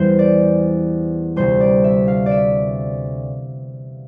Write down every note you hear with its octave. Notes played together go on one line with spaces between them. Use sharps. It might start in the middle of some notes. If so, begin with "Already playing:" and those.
Already playing: E2 E3 G3 C5
D5
D2 C3 G3 C5
D5
E5
F5
D5
E5